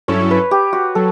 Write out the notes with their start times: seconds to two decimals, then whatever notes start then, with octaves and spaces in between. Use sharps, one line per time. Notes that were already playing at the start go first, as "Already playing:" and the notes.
0.08 G2 F#3 C#4 E4 A4 C#5
0.31 B4
0.51 G4
0.73 F#4
0.95 F#3 A4